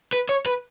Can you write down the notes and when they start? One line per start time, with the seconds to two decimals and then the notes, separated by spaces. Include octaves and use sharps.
0.13 B4
0.29 C#5
0.46 B4